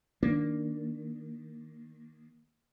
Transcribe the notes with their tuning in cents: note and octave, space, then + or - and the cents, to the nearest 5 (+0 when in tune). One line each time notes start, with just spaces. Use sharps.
D#3 +0 A#3 +0 D4 +0